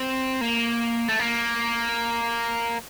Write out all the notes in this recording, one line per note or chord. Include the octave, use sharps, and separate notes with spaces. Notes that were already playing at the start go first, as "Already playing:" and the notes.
Already playing: C4
A#3
A3
A#3